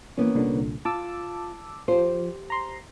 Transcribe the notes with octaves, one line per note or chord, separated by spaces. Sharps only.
E3 A#3 B3 C#4
C2 A#2 D3
F4 A5 D6 E6
F3 G4 C5
A#5 C6